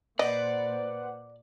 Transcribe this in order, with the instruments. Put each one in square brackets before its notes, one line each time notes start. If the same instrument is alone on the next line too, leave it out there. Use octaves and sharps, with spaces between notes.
[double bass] A#2 A#3 [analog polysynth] B4 C5 F#5 [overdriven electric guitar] D5 [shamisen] D#5